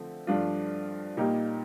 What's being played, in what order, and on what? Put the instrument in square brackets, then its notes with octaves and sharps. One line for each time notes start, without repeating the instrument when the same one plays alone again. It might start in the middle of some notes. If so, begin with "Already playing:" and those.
Already playing: [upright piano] D3 F3 A3 C4
G2 F3 A3 D4 F4
A#2 G3 A#3 D#4 G4